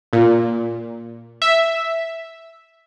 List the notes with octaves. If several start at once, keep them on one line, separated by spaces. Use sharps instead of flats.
A#2
E5